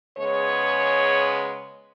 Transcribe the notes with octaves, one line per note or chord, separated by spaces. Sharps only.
C#3 G#3 B3 C#5